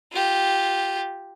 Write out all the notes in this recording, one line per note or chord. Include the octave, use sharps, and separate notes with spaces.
F4 G4